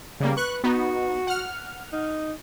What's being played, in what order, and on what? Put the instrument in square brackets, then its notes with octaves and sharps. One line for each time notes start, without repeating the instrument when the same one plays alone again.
[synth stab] C#3 G3 A#3
[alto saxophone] B4 [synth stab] C#6 F#6
[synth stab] B3 D#4 [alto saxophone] F#4
[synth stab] F#5 F6
[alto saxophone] D#4